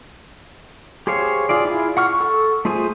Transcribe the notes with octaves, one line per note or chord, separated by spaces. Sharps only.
G4 G#4 C5 C#5 F5
F4 G#4 D5
E4 F4 G#4
F#5 C#6 F6
A4 C#6
A3 F4 G#4 C5 G#5